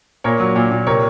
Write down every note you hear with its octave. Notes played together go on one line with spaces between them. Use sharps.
A#2 A#4 C#5
F#3
A#2
A#2
C3 A#4 C#5